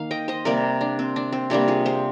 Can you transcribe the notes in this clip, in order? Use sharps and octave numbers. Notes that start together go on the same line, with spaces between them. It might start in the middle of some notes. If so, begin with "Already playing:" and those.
Already playing: D#3 A#3 F5
D#5 G5
C5 D#5
C3 G3 A#3 A#4 D5
D4
C4
D4
C4
C3 G3 A#3 D4
F4 G#4
G#4 C5